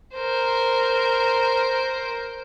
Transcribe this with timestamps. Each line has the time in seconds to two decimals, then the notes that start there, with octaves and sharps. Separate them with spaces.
0.15 A#4 C5